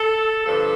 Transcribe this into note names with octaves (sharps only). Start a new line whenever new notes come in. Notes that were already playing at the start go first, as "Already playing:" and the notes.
Already playing: A4
G2 D3 F3 A4